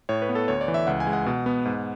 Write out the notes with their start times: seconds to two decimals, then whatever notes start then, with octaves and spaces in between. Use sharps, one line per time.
0.09 A2 C#5
0.22 B4
0.29 B3
0.35 A4
0.48 D2 C#5
0.61 D5
0.68 E3
0.74 E5
0.87 C#2 F#5
1.00 G#5
1.07 G#3
1.13 F#5
1.26 B2
1.46 B3
1.65 G#2